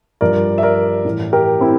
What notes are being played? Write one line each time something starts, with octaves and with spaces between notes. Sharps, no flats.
G2 F3 A#4 D5
E5
A#4 D5
A2 E3
G4 A#4
C4 E4